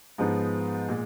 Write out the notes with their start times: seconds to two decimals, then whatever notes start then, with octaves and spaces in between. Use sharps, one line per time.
0.18 G#2 F3 G#3 B3 D#4
0.89 A#2 G#3